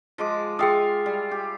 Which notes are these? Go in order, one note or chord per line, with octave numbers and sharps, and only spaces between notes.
F3 G#3 D6
F4 G#4 E5 F5 G5 D#6
G3
G4